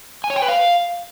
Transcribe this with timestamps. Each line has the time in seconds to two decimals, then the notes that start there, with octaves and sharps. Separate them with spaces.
0.24 G#5
0.30 C#5
0.36 G5
0.42 B4
0.48 F5